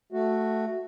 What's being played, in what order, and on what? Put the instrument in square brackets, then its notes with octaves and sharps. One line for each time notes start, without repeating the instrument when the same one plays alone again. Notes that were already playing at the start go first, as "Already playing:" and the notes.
[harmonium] A3 F#4